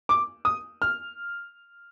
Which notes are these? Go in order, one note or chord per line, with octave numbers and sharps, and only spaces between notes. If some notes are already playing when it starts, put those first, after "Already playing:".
D6
D#6
F6